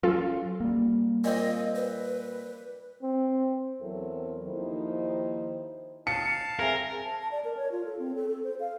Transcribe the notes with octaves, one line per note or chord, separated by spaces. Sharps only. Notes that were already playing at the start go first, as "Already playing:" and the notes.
F#3 C#4 F4 A4 F5
G3 A#3
A#2 C4 D#5
B4
C4
E2 F#3 C4 E4 A4 A#4
D#2 D#3 F3 D#4 E4 C5
F5 A5 C#7
C4 G#4 A#4 E5 G#5
A5
A5
D5
A#4
C#5
F4
A4
C4
A4
A4
C5
F5